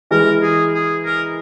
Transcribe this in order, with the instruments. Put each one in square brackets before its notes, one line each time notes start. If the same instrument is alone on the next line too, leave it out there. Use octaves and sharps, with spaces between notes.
[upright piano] E3 G#3 [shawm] A#4
[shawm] G#4
G#4
A#4